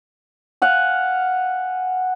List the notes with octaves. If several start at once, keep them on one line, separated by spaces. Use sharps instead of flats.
F5 F#5 G#5